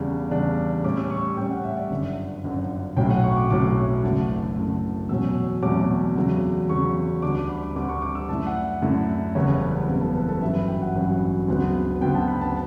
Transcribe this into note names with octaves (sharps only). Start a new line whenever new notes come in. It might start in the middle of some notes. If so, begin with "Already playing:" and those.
Already playing: E2 C#3 G3 D4
E2 C#3 G3 D4
A2 G3 C#4 D6
E6
C#6
A2 G3 C#4 G5
F#5
E5
D5
G1 F#2 D3
G1 F#2 D3
B1 A2 F#3 C#4 E4 G5
F#5
C#6
D6
B1 A2 F#3 C#4 E4 D6
F#1 F#2 D3 A3
F#1 F#2 D3 A3
E2 B2 F#3 A3 C#4 E6
E2 B2 F#3 A3 C#4 D6
E2 C#3 F#3
E2 C#3 F#3 C#6
D2 D3 G3 D4 D6
D6
B5
D6
D2 D3 G3 D4 D6
C#6
D6
E6
F#2 D3 A3 E4 A5
F#5
F#2 D3 A3 E4
F#1 E2 C#3 G3 B3 C#5
F#1 E2 C#3 G3 B3
A4
B4
A4
A1 G2 F#3 E5
B5
G5
F#5
A1 G2 F#3
D2 C#3 F#3 B3
D2 C#3 F#3 B3 G5
A5
B5
A5